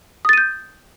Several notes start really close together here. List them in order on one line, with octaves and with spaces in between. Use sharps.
D#6 A6 D#7 G6